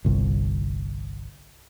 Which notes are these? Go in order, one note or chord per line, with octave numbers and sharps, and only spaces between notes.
G1 C2